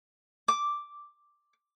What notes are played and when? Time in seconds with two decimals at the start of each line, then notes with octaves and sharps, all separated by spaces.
0.48 D6